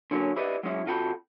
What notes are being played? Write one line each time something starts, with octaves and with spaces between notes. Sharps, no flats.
D3 F#3 A#3 C#4
E4 G4 B4 D5 D#5
F#3 G#3 C#4 E4
C3 F4 F#4 A4 G5 B5